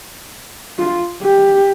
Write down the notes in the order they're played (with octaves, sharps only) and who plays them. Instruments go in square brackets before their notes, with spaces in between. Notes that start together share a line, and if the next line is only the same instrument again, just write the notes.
[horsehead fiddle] F4
G4